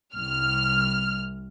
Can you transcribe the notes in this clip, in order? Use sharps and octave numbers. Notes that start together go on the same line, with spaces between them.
C2 F6